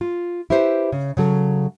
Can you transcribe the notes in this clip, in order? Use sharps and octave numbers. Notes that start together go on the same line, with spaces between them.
F4
E4 G4 B4 C5
C#3
C#3 F#3 A4